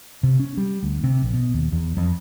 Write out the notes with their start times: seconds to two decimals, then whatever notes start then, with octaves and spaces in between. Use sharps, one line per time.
0.23 C3
0.39 C#4
0.57 G3
0.83 D2
1.03 C3
1.22 A#1
1.34 B2
1.54 D#2
1.72 E2
1.97 F2